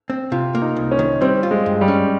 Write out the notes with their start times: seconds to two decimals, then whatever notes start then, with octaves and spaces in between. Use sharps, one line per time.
0.10 C4
0.32 C3 F4
0.55 A#3
0.61 D#4
0.76 C2
0.91 C#4
0.99 D#3
1.21 G3 C4
1.43 F4
1.51 G#3
1.66 G2
1.81 G3
1.88 C#4